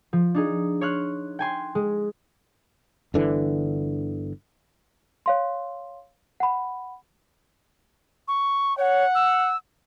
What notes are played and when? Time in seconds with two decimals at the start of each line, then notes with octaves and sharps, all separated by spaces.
0.13 F3
0.35 D4 D#4 G#4
0.81 C#5 C6 F6 F#6
1.39 G5 G#5 C6
1.75 G#3
3.14 G1 D3 E3
5.26 C#5 F5 C6
6.40 F#5 B5
8.28 C#6
8.78 C#5 F#5
9.15 E6